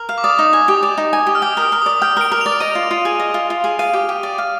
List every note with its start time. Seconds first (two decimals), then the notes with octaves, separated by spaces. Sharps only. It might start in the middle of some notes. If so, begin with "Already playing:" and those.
Already playing: A#4
0.09 F5
0.18 D6
0.24 D5 D#6
0.39 D#4
0.53 G#5
0.68 G4
0.83 D5
0.98 D#4
1.13 G#5
1.27 G4
1.35 F6
1.42 G5 D#6
1.57 A#4
1.62 F6
1.72 A#4
1.82 D5 D#6
2.02 G5 F6
2.17 A#4 D7
2.32 A#4
2.41 D5 F7
2.60 D#5 D#7
2.75 F4
2.91 F4
3.05 G#4
3.19 D#5
3.34 F4
3.50 F4
3.64 G#4
3.79 F5 D#7
3.93 G4
4.09 G4
4.23 D5
4.38 F5